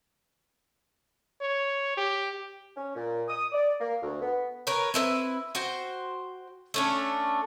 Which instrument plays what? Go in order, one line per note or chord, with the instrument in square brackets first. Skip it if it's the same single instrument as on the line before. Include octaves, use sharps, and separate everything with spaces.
[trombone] C#5
G4
[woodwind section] C#4
A#2
D#6
D5
A#3
D2
B3
[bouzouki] A#4 B4 C#5
C4 E4 A4 B4
F#4 C5 G5
A3 C#4 D4